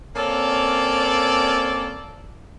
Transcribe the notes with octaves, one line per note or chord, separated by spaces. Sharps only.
A#3 C4 C#4 A4 C#5 D5